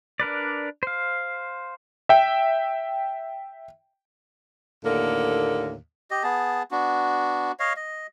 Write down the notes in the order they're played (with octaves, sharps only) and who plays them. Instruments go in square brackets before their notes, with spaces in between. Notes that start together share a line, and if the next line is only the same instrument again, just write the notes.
[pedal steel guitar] D4 A#4 B4 D5
C5 F5
[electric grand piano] E5 G5
[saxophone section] D#2 A2 D3 A#3
[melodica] G4 D#5
B3 G#4 A5
B3 D4 F#4
C#5 D#5 F5
D#5